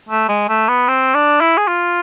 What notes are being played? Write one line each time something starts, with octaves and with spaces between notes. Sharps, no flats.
A3
G#3
A3
B3
C4
D4
E4
G#4
F4